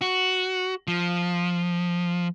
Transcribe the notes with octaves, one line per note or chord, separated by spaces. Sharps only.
F#4
F3